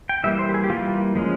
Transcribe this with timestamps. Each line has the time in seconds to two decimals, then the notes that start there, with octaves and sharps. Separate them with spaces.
0.09 G5
0.24 E3 G3 A#3 E5
0.39 C5
0.49 G4
0.54 G#4
0.64 G4
0.70 E3 G3 A#3 F4
1.15 F3 G#3 C#4